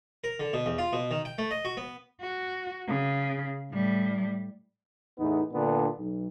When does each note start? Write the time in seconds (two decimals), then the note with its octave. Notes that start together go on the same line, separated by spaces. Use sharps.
0.24 A#4
0.40 D3
0.53 B2
0.66 E2
0.78 F4
0.93 B2
1.11 D#3
1.25 G5
1.38 A3
1.51 D#5
1.65 F#4
1.77 B3
2.21 F#4
2.88 C#3
3.72 A2 G3
5.18 E2 A2 B3 D#4
5.52 A#2 D3 B3 D4
5.96 B1